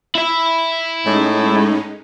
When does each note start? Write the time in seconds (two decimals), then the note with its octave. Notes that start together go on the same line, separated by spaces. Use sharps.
0.15 E4 E5
1.06 A2 G#3 C#4 D#4